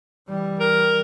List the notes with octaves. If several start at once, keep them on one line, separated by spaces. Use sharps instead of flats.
E3 G3
A#4